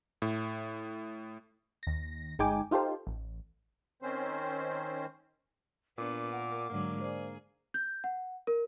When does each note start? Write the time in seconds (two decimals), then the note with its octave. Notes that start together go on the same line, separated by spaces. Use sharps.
0.22 A2
1.83 D#2 A#6
2.39 G1 G#3 D#4 G5 G#5 D6
2.71 D#4 F4 G4 A4 C5
3.07 A1
4.02 D#3 C4 C#4 C5
5.98 A#2 B3 D4 D6
6.32 A#4 F#5
6.70 G#2 D3 F#3 A#3
7.01 G#4 C5 D5
7.74 G6
8.04 F#5
8.47 A#4